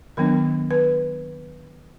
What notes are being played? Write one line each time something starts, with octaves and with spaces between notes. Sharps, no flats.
D#3 F#3 B3 D4 A#4
B4